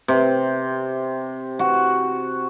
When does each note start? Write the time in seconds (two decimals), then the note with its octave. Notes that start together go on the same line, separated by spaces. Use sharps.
0.08 C3
1.59 F#4